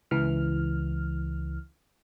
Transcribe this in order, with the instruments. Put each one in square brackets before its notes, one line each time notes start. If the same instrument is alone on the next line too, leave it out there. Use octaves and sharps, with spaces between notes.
[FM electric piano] C#2 E3 F6